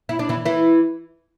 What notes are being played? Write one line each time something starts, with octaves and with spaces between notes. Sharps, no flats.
E4
D4
E3 E4
E3 E4